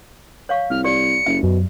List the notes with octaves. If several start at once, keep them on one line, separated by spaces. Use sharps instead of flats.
C#5 F5 C#6
C2 F6
G4 D5 C#7
F#1 E5
F#2 B2